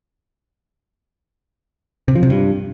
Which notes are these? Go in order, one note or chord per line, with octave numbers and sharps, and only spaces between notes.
C3
F3
C3
G2